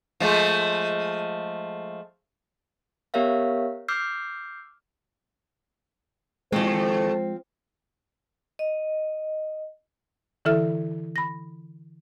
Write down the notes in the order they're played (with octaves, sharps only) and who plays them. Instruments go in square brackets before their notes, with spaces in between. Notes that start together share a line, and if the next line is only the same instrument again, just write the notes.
[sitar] F3 G#3 A3
[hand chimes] B3 G4 A#4 C#5 E5 F5
D6 E6 F6 G6 C7
[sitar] D#2 C3 A3 [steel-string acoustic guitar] F3 C4 [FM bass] G#3 [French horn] C5
[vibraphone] D#5
[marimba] D3 E3 E4 A4 E5 F6
B5 A#6